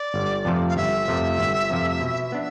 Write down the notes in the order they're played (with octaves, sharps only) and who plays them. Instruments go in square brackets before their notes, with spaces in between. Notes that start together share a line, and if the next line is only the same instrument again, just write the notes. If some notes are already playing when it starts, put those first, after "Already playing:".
Already playing: [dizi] D5
[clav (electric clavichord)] G1
F2 C3 F3 A3
[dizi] F5
[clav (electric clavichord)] G1 [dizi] E5
[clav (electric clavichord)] F2 C3 F3 A3
G1
F2 C3 F3 A3
B2
B3 D4